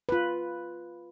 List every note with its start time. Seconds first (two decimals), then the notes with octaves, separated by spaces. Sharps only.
0.09 F4 B4